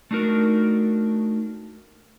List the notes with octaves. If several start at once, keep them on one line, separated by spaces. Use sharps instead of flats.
A3 D4 D#4 F#4 A#4